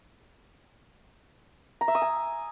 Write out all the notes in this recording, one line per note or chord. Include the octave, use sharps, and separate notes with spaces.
A#5
E5
D#6
G#5